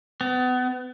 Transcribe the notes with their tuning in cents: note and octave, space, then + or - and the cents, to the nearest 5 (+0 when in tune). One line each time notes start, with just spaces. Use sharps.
B3 +30